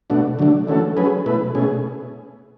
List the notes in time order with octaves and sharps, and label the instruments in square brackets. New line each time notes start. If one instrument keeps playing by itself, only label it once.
[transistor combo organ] B2 A3 D4 F#4
D3 F#3 A3 D4
E3 A3 C#4 F#4 A4
F#3 C#4 G#4 B4
B2 A3 E4 B4
B2 A3 C#4 G#4